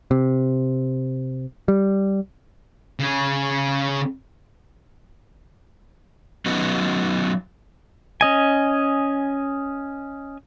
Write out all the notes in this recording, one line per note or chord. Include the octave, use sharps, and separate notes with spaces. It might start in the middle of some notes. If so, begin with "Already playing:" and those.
C3
G3
C#3 G#4
F#3 B3 C#4 D#4 F#4 B4
C#4 D#5 G#5